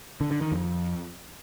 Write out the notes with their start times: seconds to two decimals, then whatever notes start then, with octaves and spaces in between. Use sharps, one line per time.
0.21 D3
0.31 D3
0.41 D#3
0.52 F2